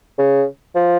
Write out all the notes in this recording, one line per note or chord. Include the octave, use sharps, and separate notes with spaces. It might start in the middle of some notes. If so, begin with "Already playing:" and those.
C#3
F3